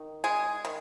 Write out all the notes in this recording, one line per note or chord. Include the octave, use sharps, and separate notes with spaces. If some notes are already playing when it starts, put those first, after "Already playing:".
Already playing: D#3
G#3 G#4
D#3